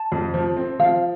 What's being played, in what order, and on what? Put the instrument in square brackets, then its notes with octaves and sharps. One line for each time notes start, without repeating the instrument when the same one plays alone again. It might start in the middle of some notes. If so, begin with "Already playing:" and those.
Already playing: [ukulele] A5
[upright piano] F2
F3
C4
[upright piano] F3 [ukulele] F5